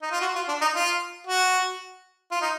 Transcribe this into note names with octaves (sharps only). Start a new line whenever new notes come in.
D#4
F4
F#4
F4
D4
D#4
F4
F#4
F4
D#4